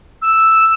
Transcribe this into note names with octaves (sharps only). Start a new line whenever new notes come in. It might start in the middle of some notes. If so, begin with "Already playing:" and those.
E6